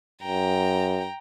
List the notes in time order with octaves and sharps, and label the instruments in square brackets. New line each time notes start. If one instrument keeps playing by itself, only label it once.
[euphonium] F#2 [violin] G5 A#5